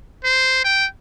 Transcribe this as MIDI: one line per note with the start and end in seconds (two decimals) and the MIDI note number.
0.24 0.64 72
0.64 0.86 79